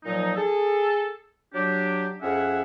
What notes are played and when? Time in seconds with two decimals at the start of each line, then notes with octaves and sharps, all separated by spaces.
0.04 A#2 F3 F#3 D#4
0.36 G#4 A4
1.53 F#3 D4 G4
2.21 F2 C#4 G#4 E5 F#5